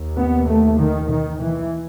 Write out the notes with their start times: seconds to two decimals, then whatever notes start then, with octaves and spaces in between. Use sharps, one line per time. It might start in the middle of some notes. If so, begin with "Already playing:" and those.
Already playing: D#2
0.17 B3
0.47 A3
0.78 D#3
1.09 D#3
1.40 E3